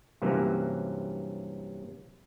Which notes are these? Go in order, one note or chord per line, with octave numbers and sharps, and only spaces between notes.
G2 C3 E3 F#3 A#3 C#4